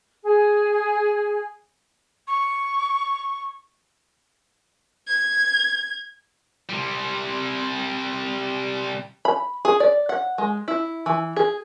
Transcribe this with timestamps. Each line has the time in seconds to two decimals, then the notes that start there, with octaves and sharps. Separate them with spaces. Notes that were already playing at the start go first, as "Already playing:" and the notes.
0.21 G#4
2.28 C#6
5.07 G#6
6.70 C3 G3
9.25 B5
9.65 G#4
9.80 D5
10.09 F#5
10.38 G#3
10.68 E4
11.06 E3
11.36 G#4